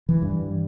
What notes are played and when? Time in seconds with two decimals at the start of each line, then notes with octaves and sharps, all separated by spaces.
0.09 E3
0.22 G2